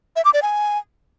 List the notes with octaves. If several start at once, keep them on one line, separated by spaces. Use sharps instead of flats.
E5
D6
D5
G#5